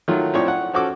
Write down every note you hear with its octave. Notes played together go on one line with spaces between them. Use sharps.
D#3 F#3 A3 F4
A2 F3 C4 D4 C#5 C#6
F#5
F3 C#4 F#4 A4 D6